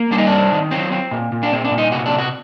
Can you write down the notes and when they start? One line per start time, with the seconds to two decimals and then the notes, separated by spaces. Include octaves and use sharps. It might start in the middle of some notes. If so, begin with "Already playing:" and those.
Already playing: A#3
0.11 G3 D4
0.18 D#4
0.26 D4
0.32 C4
0.52 D#3
0.71 F#3 C4
0.92 C4
1.11 A#2
1.32 A#2
1.43 D4
1.52 A#2 C4
1.65 D4
1.71 A#2
1.78 D#4
1.92 C3 F#4
2.06 D4
2.12 C3
2.18 F#4